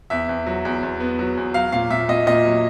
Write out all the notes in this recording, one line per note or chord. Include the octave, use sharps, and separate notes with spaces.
E2 E5
E2
F#3
E2
E2
B3
F#3
E2
F#3 F5
A#2 F5
A#2 E5
A#2 D#5
A#2 D#5
F#3